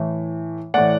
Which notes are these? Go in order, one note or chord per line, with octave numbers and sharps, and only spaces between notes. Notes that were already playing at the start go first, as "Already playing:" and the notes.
Already playing: A2 E3 A3
A2 E3 A3 D5 F#5